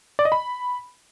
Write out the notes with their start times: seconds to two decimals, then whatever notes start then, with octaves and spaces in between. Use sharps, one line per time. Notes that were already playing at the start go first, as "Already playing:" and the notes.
0.19 D5
0.25 D#5
0.32 B5